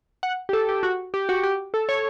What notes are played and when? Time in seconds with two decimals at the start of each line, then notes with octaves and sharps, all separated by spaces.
0.23 F#5
0.49 G4
0.53 A4
0.69 G4
0.83 F#4
1.14 G4
1.29 F#4
1.43 G4
1.74 A4
1.89 C#5